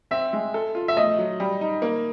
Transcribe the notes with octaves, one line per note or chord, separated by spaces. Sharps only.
C4 E5
G#3
A4
F4
E5
A3 D#5
F#3
G3
D#4
A#3